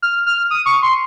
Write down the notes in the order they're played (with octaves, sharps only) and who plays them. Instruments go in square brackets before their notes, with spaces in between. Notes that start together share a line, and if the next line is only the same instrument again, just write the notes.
[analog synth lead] F6
F6
D#6
C#6
C6